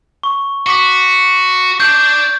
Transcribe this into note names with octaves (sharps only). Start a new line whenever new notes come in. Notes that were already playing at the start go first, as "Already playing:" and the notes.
C#6
F#4 C#6 D6 B6
D4 D5 G6